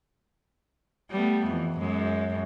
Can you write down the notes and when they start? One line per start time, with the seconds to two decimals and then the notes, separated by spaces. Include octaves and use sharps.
1.11 G3 A3 B3
1.48 F2 E3
1.79 F#2 G#3